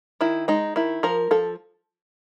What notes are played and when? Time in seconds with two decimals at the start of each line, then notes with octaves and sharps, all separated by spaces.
0.21 D#3 E4
0.48 G#3 D#4
0.76 D#3 E4
1.03 F3 A#4
1.31 F3 A4